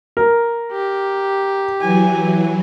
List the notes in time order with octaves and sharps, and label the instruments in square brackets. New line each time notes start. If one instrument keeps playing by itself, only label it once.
[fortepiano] A#4
[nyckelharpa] G4
[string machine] E3 F#3 [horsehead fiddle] G#5